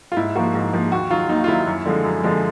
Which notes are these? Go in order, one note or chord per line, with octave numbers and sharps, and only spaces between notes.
F4
G#2 E4
F3 A#3 F#4
G#2
F3 A#3
D#2 F#4
D#3 F#3 F4
D#2 D#4
F4
D#3 F#3 E4
F#2
D3 F3 G#3
F#2
D3 F3 G#3